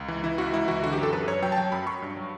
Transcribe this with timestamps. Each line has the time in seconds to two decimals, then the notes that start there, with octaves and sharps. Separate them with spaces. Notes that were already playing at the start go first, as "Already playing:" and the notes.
Already playing: C#2
0.08 E3
0.23 E3 E4
0.38 C#2 F#4
0.53 C#2 E4
0.68 E3 F#4
0.83 D3 F#4
0.93 F#2 G4
1.03 A4
1.13 F#2 B4
1.28 F#2 C#5
1.42 F#3 G5
1.52 A5
1.57 F#3 G5
1.72 F#2 B5
1.86 F#3 C#6
2.02 G2
2.16 F#3